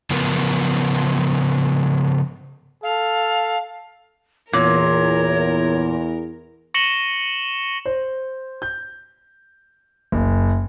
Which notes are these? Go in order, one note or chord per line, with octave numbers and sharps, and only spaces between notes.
C#3 F3 B3 A#4
A4 F5
E2 A#2 E3 A#4 C#5
C#6 A#6 C#7 E7 F#7 G7
C5
G6
F#1